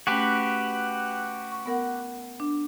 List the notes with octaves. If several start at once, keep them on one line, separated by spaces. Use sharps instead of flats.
A3 C#4 F#4 G4 B4
C#6
B3 A#4 F#5
D4